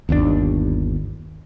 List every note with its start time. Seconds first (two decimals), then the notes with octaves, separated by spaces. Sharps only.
0.09 G1 D#2 A#2 D4